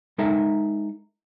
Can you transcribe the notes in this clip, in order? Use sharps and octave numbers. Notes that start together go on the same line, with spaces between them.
G#3 D#4 A4 A#4 D#5 E5